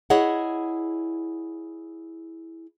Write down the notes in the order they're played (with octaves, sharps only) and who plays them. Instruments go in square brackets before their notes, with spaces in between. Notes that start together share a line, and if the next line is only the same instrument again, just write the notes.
[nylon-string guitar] E4 G#4 C#5 D#5 F#5